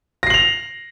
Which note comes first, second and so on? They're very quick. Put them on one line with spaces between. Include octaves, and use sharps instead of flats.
A#6 C7 F#7 F7